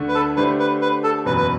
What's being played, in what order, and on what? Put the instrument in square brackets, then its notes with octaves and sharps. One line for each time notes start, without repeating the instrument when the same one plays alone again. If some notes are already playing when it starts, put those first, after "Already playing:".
Already playing: [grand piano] D2 D3 A3
[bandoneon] B4
A4
[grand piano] D3 A3 D4 G4 C5 [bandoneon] B4
[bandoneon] B4
B4
A4
[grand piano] F#1 E2 B2 F#3 [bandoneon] B4
[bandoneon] B4